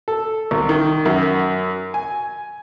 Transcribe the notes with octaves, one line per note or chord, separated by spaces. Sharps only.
A4
C2
D#3
F#2
G#5